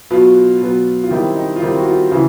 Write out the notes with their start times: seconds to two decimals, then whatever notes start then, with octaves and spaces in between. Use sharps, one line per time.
0.10 B2 F#3 B3 F4
0.61 B2 F#3 B3
1.04 F4
1.11 D#3 G3 C4 E4
1.36 D#4
1.56 F4
1.62 D#3 G3 C4 E4
1.77 F#4
1.87 F4
2.11 C#3 E3 E4